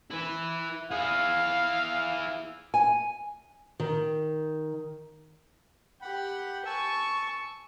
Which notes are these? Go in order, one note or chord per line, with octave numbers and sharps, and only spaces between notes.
E4 B4
E4 G#4 F5
G#5
D#3
G4 F#5 B5
G#5 A5 C#6 E6